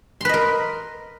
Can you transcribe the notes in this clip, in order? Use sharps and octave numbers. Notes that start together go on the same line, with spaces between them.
A#4 B4 D#5 C6